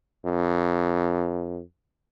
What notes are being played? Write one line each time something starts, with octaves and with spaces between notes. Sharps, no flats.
F2